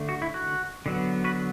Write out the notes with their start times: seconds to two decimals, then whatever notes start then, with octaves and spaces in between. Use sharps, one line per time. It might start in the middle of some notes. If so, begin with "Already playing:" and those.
Already playing: D3 A3
0.09 F#4
0.22 E4
0.34 F#4
0.86 D3 F#3 B3
1.24 F#4 B4